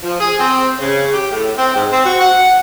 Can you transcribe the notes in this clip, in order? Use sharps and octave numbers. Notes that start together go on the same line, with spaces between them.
F3
G#4
C4
C#3
G4
A2
C4
G#2
C4
F#4
F#5